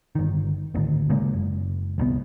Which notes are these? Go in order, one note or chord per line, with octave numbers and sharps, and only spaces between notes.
G1 D#3
D1 G#1 D2 D#3
C#3 G#3 A#3
F#1
D#1 C2 B2 B3